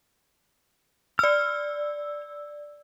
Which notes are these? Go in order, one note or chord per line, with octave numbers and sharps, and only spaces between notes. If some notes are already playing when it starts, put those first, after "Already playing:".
D5 E6 F6